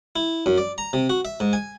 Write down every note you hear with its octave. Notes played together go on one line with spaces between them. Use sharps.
E4
F#2
D5
A#5
C3
F#4
E5
G#2
G#5